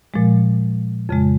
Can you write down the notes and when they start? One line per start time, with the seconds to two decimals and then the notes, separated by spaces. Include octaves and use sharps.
0.14 A#2 F3 G#3
1.09 F2 C#3 G#3